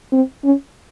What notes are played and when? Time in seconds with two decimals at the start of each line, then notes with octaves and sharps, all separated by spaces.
0.13 C4
0.44 C#4